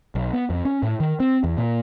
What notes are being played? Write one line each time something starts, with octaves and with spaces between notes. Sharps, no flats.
B1
B3
F2
C#4
A2
D#3
C4
E2
A#2